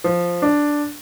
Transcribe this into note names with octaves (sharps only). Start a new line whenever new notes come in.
F3
D4